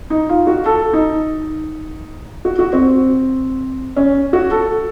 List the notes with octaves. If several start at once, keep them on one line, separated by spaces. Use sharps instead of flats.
D#4
F4
F#4
A4
D#4
F#4
F#4
C4
C#4
F#4
A4